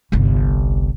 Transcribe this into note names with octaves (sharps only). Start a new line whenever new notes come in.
G1 C2